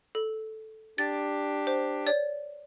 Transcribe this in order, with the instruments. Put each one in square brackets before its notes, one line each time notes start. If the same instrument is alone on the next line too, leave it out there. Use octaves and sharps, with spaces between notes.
[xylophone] A4
[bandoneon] D4 G4 [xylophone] A6
[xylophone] C5
C#5 D5